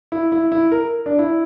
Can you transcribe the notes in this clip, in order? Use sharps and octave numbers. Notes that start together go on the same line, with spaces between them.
E4
E4
E4
A#4
D4
E4